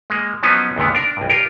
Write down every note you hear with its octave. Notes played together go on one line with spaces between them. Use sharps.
G#3 A#3
F3 F#3 B3 C#4 D#4
C#2 G2 A#2 D3 D#3 B3
D4 A#4
B1 G2
F4 G4 A#4